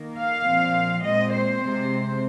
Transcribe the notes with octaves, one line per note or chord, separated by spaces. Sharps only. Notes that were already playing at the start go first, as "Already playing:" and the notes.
Already playing: D#3 A#3
F5
A#2 F3 C4
A#2 G#3 C4 D#5
C5
C3 G#3 C4